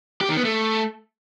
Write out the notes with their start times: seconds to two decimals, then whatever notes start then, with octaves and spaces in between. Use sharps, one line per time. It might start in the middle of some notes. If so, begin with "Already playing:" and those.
0.21 G4
0.29 D#3
0.37 B3
0.45 A3